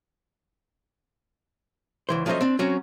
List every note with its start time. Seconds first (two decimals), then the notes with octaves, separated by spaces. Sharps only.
2.09 C#2 E3 C5
2.26 F3 F#3 A3 C#4 C5 D#5
2.41 C4 D4
2.59 F#3 C4 C#4 F#4